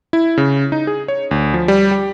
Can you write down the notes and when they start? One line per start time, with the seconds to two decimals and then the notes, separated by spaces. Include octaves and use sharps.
0.13 E4
0.37 C#3
0.72 D#4
0.87 G#4
1.08 C#5
1.31 D2
1.54 F3
1.68 G3
1.91 G4